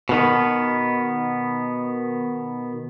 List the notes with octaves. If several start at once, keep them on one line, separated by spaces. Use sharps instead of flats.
B2 D#3 B3